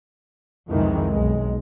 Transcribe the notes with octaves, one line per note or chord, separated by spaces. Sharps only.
C2 F2 C3 D#3 E3 G#3
B1 G#3